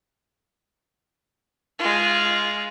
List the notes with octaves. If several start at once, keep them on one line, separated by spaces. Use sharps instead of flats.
G#3 F4